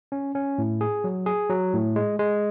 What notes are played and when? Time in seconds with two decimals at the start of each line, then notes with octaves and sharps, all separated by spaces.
0.12 C#4
0.35 C#4
0.58 A2
0.81 G#4
1.04 F#3
1.26 G#4
1.50 F#3
1.73 A2
1.96 G#3
2.19 G#3